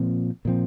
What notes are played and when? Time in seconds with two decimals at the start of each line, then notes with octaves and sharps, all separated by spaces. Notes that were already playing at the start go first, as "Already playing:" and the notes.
Already playing: A#2 F3 C4
0.45 A#2 F3 C4